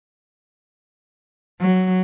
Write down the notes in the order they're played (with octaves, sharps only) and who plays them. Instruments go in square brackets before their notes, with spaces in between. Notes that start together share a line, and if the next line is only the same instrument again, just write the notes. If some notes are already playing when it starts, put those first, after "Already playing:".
[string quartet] F#3